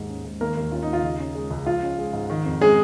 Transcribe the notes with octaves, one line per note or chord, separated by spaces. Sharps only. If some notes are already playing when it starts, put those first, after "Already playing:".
Already playing: D#2 G#2 G#3
C#4
G#2
D#3 A#3 A#4
D#2
C#4 F4
D#4
D#2
F4
C#3 D#4
C#4
G#3
C#2
F3 F4
C#4
G#3
G#2
D#3
F2
G#3 C#4 G#4